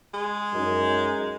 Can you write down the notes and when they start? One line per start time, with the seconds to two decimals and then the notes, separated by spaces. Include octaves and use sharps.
0.14 G#3
0.54 F#2 D#4